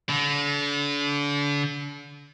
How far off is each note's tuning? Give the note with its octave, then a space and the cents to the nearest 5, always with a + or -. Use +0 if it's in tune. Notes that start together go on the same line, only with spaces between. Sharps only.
D3 -35